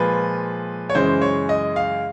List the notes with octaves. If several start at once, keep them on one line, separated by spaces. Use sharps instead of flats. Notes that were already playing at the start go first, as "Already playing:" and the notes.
Already playing: A#2 F3 G#3 B4
C#5
F#2 C#3 E3 G#3 C5
C#5
D#5
F5